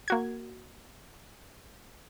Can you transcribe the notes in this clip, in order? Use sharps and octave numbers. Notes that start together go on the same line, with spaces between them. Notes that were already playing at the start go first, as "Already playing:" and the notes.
A#3 F#4 G#6